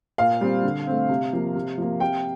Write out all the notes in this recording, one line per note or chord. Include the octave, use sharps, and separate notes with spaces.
A#2 F5
G3 C4
D3
A3 C4
C3
F3 A#3
C3
F3 A#3
C3 G5